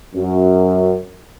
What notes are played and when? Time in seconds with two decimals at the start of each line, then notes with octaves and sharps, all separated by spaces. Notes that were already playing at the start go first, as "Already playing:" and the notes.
0.15 F#2